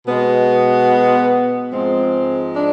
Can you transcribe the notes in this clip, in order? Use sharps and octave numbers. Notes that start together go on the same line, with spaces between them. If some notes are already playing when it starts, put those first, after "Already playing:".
B2 G#3 B3
G#2 F3 G#3 C4
D4